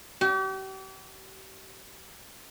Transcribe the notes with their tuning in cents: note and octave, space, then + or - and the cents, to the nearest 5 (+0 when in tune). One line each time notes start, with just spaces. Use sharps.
G4 -40